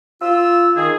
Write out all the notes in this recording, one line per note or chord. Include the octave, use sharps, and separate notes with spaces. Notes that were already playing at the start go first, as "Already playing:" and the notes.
F4 E6
D#3 G#4